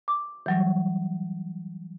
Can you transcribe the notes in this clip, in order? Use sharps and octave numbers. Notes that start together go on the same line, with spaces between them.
D6
E3 F#3 G3